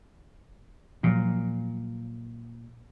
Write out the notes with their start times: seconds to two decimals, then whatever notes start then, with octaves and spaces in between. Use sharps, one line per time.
1.03 A#2 F3 F#3